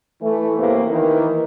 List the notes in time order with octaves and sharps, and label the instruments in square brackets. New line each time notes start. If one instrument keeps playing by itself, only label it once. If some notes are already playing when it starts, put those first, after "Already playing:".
[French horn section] E3 A3
F#2 A2 C3 E3 A#3 B3
D#3 E3 A#4